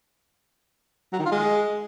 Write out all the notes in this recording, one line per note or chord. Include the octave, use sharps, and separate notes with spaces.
F#3
D#3
F4
G#3